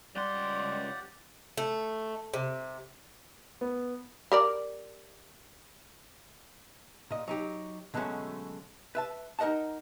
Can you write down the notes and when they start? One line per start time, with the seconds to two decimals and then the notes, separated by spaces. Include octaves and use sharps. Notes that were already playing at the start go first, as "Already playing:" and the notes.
0.16 C#2 G3 G4 D5 F#5 C6
1.57 A3
2.34 C3
3.61 B3
4.32 G4 A#4 D5
7.11 A#2 D#5
7.28 F#3 D#4 G4
7.94 B2 D3 F#3 G#3 A3 C#4
8.95 B4 E5 A5
9.39 D#4 A#4 D#5 F#5 A5